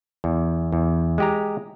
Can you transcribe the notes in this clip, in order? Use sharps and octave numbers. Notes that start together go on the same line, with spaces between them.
E2
E2
G#3 G4 A#5